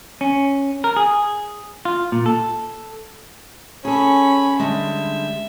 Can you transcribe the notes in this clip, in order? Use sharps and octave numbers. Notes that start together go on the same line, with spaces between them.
C#4
A#4
G#4
F4
A#2
A4
C#4 G#4 A4 B5
D3 G3 G#3 E5